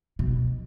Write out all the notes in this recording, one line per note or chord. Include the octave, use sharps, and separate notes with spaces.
B2